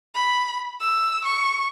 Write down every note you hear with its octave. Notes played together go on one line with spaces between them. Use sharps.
B5
E6
C#6